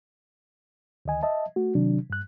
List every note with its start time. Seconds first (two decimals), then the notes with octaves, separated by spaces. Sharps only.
1.05 D2 D#3 D#5 G#5
1.23 D#5 E5 A5
1.56 A3 F#4
1.75 C3 D#3 F#3 D4
2.10 G2 F#6